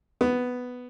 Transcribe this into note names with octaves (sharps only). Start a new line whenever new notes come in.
B3